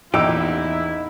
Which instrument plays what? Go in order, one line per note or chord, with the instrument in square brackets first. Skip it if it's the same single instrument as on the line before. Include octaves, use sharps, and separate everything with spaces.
[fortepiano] A1 A#2 E6 [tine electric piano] E2 [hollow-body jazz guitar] D#4 G4 [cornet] E4